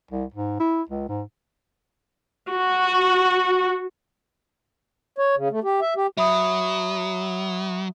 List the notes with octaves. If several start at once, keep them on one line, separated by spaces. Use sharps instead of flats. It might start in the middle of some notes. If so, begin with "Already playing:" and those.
C2
G#2
E4
C#2
G#2
F#4
C#5
C#3
A3
G4
E5
G4
F#3 E5 B5 D#6